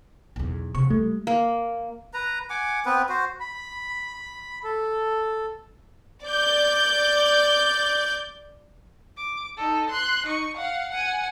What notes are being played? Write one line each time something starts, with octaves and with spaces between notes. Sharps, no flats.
B1 E2
E1 C3 C#6
G3 A3
A#3
B4 A#5
F#5 G#5 D6
B3 C4 B4
F#4 C5
B5
A4
D5 G6
D6
D#4 A4
C6 F#6
D#4 C#6
F5 F#5
F#5 G#5